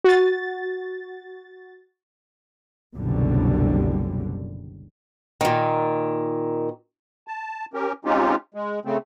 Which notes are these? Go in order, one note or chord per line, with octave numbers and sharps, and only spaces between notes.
F#4 A6
F#1 C2 F#2 B2 D3 G3
A#2 D#3
A5
C#4 G4 A#4
G#3 C4 C#4 D#4 F4 G4
G#3
C#3 A3 C4